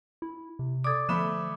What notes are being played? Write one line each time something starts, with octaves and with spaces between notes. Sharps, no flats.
E4
C3
A4 D5 D6 D#6 G#6
D3 F3 A3 B5 E7